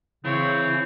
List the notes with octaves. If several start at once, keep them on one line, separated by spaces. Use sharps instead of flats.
C#3 E3 C4 C#5